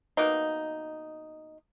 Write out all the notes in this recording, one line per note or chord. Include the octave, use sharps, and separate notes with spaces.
B2 A#3 D#4